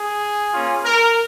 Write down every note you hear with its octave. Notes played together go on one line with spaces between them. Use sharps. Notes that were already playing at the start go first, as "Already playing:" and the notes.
Already playing: G#4
A#3 C#4 F4
A#4